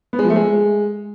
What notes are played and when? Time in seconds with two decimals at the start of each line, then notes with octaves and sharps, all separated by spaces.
0.13 B3
0.19 G#3
0.24 F3
0.30 A3
0.36 G#3